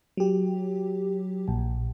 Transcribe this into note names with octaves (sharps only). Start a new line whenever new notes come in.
F#3 G4
A#1